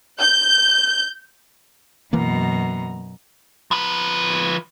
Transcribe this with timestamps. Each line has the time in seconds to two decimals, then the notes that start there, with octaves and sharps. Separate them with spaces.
0.21 G6
2.13 F#2 B2 E3 A#3 A#5
3.71 F3 B4